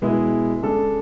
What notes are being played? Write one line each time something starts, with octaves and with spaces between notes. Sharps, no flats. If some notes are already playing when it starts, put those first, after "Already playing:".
B2 G#3 B3 E4 G#4
C#3 G#3 D4 A4